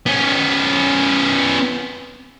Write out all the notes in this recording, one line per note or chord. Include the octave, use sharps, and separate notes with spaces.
B3 C#4